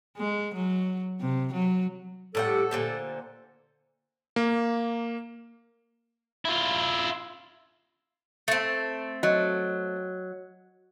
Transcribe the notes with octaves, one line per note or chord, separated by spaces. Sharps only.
G#3
F#3
C3
F#3
A2 G3 A4 F#5
A#2 D3 C5
A#3
E4 F4
A3 C4
F#3 D#5